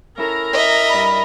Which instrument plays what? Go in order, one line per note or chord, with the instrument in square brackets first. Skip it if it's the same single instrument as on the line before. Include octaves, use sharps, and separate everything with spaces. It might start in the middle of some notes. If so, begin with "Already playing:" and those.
[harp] C#4 E4 A4 [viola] A#4 A#5
[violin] D#5 E5
[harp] G2 D5 B5